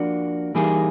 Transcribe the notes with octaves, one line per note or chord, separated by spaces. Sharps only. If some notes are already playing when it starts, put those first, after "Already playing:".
Already playing: F3 A#3 D4 F#4
E3 G3 A#3 D#4 G#4